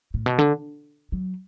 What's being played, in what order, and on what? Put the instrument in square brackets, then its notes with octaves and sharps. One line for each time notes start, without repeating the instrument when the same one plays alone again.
[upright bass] A2
B2
D3
F#3